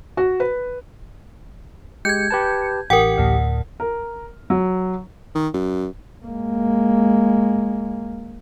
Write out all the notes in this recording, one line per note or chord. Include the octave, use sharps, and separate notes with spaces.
F#4
B4
G#3 G4 G6 G#6 C#7
G4 B4 A5
A1 G4 A#4 F#5 G5 C#7
D2 A2
A#4
F#3
D#3
F#2
G#3 A#3